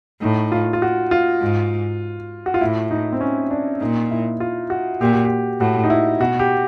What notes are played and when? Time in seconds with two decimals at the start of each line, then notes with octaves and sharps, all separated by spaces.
0.21 A2 D#4
0.52 F4
0.73 F4
0.82 F#4
1.11 F4
1.42 G#2
2.46 F#4
2.54 F4
2.61 A2 E4
2.91 D#4
3.12 C4
3.21 C#4
3.51 D4
3.81 A#2 D#4
4.11 E4
4.40 F4
4.70 F#4
5.01 A#2 G4
5.13 F#4
5.25 G4
5.60 A2 F#4
5.83 D#4
5.90 E4
6.20 B2 F#4
6.39 G4